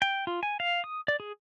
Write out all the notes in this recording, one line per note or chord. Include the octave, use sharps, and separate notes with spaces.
G5
F4
G#5
F5
D#6
D5
G#4